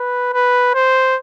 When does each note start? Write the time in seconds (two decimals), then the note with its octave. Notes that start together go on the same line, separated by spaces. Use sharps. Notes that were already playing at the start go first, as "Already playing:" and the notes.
Already playing: B4
0.34 B4
0.74 C5